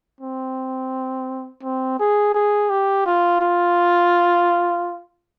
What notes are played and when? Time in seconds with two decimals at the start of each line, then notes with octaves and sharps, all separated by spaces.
0.20 C4
1.63 C4
1.99 G#4
2.34 G#4
2.70 G4
3.06 F4
3.41 F4